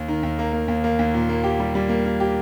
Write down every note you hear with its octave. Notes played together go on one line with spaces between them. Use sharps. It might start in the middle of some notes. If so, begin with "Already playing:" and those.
Already playing: D#2
D#3
D#2
A#3
A#3
D#2
A#3
D#2
A#2
A#3
G4
G3
G3
A#3
A#3
G4